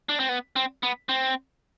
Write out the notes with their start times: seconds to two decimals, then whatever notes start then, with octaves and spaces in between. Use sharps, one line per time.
0.09 D4
0.20 C4
0.29 B3
0.56 C4
0.83 B3
1.09 C4